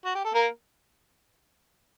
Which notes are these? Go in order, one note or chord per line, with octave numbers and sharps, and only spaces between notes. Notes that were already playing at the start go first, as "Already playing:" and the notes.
F#4
G4
A4
A#3 A#4